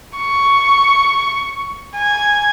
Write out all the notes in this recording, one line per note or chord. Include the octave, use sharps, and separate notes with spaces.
C#6
G#5